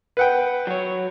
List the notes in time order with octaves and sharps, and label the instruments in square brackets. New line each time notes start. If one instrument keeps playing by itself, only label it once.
[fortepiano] B4 F#5 G5
[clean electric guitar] F#3 C#5